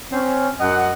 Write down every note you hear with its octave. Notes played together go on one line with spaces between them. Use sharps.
C4 C#4
F#2 D#5 F#5